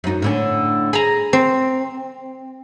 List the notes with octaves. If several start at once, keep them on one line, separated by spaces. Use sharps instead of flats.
F#2 D#4
A2 D3 C#4
G#4 A#5 B5
C4